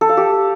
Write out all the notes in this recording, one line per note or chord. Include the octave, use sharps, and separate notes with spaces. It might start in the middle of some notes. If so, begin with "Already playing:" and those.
A4
F5
G4